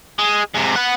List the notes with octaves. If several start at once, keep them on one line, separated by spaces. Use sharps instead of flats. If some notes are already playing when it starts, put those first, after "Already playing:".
G#3
G#2 C3
B3 F#5